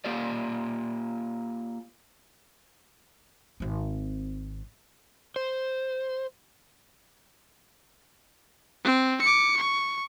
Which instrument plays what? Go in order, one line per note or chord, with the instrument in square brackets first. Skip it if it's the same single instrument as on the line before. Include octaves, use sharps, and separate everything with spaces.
[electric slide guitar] A#3 F4 G4 D5
[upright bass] G#1 C4
[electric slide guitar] C5
[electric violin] C4
D6 C#7
C#6